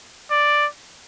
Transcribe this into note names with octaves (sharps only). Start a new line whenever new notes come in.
D5